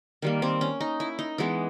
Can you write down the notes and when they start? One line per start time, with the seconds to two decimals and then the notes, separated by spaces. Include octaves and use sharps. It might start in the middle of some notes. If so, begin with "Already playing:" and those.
0.22 D#3 G3 A#3
0.42 C4
0.61 C#4
0.81 D#4
1.00 E4
1.19 D#4
1.38 E3 G#3 B3